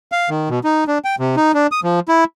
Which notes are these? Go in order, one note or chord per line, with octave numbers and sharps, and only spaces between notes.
F5
D#3
B2
D#4
D4
G5
C3
D#4
D4
D#6
F3
E4